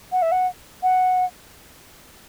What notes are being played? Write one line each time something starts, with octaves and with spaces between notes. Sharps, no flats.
F#5
E5
F#5
F#5